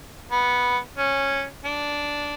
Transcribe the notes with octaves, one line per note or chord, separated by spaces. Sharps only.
B3
C#4
D4